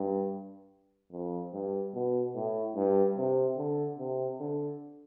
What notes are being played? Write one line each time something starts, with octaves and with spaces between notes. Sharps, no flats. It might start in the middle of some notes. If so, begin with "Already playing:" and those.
Already playing: G2
F2
G2
B2
A2
G2
C3
D3
C3
D3